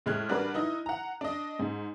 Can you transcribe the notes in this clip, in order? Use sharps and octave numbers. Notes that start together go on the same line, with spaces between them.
A2 G#3 F6 F#6 G#6
G3 D4 F#4 A#4 B4 D5
D#4 E4 D#5
F#5 A#5
D4 D#5
G#2